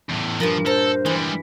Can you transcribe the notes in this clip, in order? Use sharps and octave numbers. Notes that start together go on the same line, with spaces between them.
E2 A2
G2 A#2 F3 A#4
A4 A#4 C5 A#5
E3 G3 G#3